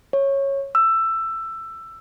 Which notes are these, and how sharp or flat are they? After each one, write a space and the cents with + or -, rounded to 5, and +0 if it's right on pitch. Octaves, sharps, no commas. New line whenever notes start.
C#5 -10
E6 +15